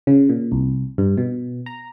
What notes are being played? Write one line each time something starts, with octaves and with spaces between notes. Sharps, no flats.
C#3
A#2
C2
G2
B2
A#5